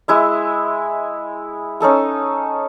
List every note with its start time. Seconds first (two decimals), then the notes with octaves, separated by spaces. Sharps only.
0.08 G#3 E4 E5
1.80 C#4 D#4 A4 G#5